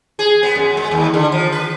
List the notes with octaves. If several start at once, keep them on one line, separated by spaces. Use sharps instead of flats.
G#4
B3
F#2
G#3
D#2
D3
F3
B4